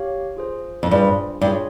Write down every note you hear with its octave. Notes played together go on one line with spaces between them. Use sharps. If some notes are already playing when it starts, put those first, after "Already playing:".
Already playing: G4 C#5 F5
F4 G#4 C5
F2
G2 F4 G#4 C5
G2
F4 G#4 C#5